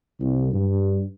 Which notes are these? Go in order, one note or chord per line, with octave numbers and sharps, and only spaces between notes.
C2
G2